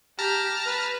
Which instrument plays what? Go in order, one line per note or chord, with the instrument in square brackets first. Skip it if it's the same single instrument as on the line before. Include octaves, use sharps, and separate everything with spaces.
[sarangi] G4 [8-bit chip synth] A5 A#5 F6
[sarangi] B4